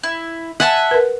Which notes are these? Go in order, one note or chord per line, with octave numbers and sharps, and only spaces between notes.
E4
E5 F#5 G#5 A5
A#4 B4